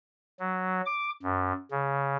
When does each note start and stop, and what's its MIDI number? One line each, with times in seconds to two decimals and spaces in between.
0.39 0.81 54
0.86 1.10 86
1.23 1.52 42
1.71 2.17 49